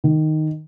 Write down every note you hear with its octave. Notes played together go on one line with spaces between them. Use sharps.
D#3